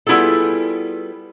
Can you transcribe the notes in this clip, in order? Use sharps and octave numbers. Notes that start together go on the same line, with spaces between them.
G3 B3 E4 F4 G#4 A4